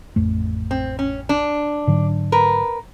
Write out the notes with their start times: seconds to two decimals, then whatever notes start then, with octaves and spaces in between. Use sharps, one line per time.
0.16 A1 F2 A3
0.71 C4
0.99 C#4
1.29 D4
1.87 G#2 D3 F#3
2.32 A#4 B4